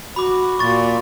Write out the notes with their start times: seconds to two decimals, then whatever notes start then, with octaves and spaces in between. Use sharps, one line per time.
0.16 F#4 B5 D6
0.59 A#2 C#6 A6